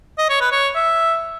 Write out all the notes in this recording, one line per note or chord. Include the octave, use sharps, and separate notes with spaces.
D#5
C#5
B4
C#5
E5